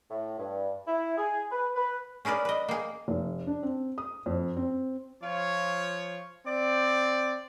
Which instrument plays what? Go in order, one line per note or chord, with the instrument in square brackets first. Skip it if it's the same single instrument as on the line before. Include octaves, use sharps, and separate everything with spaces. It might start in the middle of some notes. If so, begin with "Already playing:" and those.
[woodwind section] A2
G2
E4
G#4
B4
B4
[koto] C#4 G#4 A#4 B4 D5
B4 D#5
A#3 G#4
[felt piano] F1
D4
C4
D#6
F2
C4
[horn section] F3 F4 C#5
C4 D5